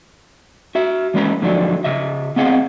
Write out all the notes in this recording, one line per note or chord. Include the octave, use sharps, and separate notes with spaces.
F#4 E5
E3 G#3 C#4 B4 D#5 A#5
G#2 D3 F3 F#3 D4 D#4
C#3 D#5 E5
B3 C4 G#4 D#5 F5 F#5